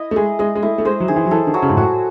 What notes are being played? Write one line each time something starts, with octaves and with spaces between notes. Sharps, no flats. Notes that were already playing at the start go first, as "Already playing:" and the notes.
Already playing: E4 D#5
A3
G#3 G#4
G#3 D#5
G#3
A3 E4
A3
G#3 C5
F#3
D#3 G#4
E3
F#3
E3 A4
D#3
F#3
C#3
G#2
A2 F#4